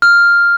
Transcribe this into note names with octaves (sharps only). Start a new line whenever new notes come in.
F6